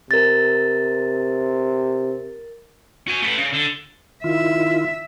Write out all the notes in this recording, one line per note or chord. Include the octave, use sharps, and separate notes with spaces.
C3 A#4 A6
F#4 G#5
A3 B4
C#3
D3
D#3 E4 F4 E5